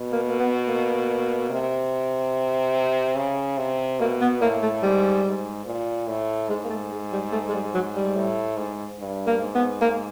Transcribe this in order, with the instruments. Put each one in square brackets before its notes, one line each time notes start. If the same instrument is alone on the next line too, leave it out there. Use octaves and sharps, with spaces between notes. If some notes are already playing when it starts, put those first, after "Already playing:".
Already playing: [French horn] B2
[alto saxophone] A#3
A#3
B3
A#3
[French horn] C3
C#3
C3
[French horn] B2 [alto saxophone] A#3
[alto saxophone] B3
[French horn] A2 [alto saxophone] A#3
[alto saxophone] A3
[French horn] G#2 [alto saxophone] G3
[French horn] G#2
A#2
A2
[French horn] G#2 [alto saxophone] G#3
[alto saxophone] A#3
A3
G#3
G3
A3
G#3
G3
F#3
G3
[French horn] A2
G#2
G2
[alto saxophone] A#3
[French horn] G#2
[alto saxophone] B3
A#3